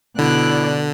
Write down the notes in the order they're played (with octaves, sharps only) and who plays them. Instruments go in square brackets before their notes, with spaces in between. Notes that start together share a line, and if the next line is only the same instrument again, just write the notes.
[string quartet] B2 D5 F#6 [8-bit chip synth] D3 [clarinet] E4